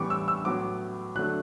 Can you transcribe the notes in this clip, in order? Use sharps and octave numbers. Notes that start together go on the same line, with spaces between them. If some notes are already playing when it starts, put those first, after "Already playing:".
Already playing: A2 E3 G3 B3 C#6 D6
E6
E6
A2 F#3 B3 D6
D3 F#3 A3 F#6